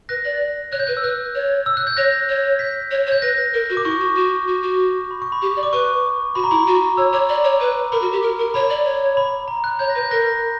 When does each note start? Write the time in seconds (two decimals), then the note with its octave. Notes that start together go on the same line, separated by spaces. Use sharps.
0.09 B4 F#6 A#6
0.25 D5
0.72 C#5 F#6
0.79 G6
0.87 B4 F#6
0.97 E6
1.03 B4 F#6
1.35 C#5
1.66 E6
1.77 F#6
1.87 G6
1.97 C#5 F#6 A#6
2.29 C#5
2.59 G6 B6
2.91 C#5
3.07 C#5
3.12 G6
3.22 B4 F#6 A#6
3.54 A#4
3.70 F#4
3.77 D6
3.84 E4 C#6
4.01 F#4
4.16 F#4
4.48 F#4
4.63 F#4
5.11 B5
5.22 C#6
5.32 B5
5.42 G4
5.57 D5
5.63 D6
5.73 B4 C#6
6.35 F#4 B5
6.44 A#5
6.51 E4 B5
6.67 F#4
6.97 C#5 E6
7.13 C#5 D6
7.29 D5
7.44 C#5
7.60 B4
7.92 A#4 B5
8.02 F#4
8.13 G4
8.23 A#4
8.39 A#4
8.54 C#5 B5
8.70 D5
8.85 C#5
9.17 B5
9.48 A#5
9.64 F#6
9.79 C#5 G6
9.90 A#6
9.95 B4
9.98 G6
10.11 A#4 F#6 A#6